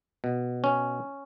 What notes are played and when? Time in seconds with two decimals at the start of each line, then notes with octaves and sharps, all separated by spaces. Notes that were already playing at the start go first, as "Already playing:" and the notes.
0.24 B2
0.64 C#4